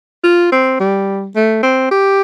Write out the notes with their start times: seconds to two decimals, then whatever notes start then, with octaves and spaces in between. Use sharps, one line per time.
0.24 F4
0.52 C4
0.80 G3
1.35 A3
1.63 C4
1.91 G4